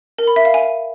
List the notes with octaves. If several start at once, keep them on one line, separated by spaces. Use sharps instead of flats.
A#4
B5
E5
F5
G#5